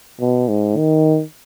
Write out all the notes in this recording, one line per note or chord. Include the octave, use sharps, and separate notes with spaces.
B2
G#2
D#3